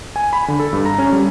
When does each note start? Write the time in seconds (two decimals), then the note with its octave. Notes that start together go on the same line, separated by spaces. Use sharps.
0.16 G#5
0.33 B5
0.48 D3
0.60 A4
0.73 G2
0.85 A#5
0.98 C#4
1.12 G3